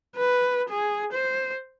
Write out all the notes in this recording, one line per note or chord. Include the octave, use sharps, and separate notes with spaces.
B4
G#4
C5